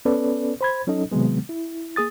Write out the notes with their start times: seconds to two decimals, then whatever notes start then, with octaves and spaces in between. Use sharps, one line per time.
0.05 B3 C#4 A4 B4 D5
0.61 C5 B5 G#6
0.87 F#3 C#4 D#4 A4 D#5
1.11 C3 D#3 F#3 G#3 B3
1.49 E4
1.96 A#3 G#4 D#6 A6